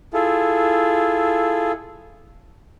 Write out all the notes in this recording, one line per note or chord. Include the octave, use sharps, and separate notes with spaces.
E4 F4 G#4 A4